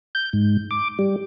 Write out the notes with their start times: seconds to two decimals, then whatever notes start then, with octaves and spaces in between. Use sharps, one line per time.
0.15 G6
0.33 G#2
0.71 D6
0.99 G3